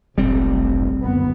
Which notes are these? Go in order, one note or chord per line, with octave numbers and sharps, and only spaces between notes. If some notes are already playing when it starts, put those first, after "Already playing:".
F1 B1 A2 G3 C4
F#1 D2 B3